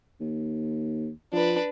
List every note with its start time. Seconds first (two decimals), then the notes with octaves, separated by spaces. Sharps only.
0.21 D#2
1.33 F3 D4 B4